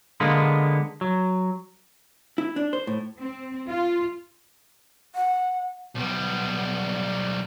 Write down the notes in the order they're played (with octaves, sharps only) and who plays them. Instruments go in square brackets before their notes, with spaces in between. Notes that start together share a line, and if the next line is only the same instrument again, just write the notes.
[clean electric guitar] D3 G#3 A#3 B3
F#3
[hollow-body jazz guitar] E4
D4
C5
A2
[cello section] C4
F4
[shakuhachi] F#5
[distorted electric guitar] B1 G3 [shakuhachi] B3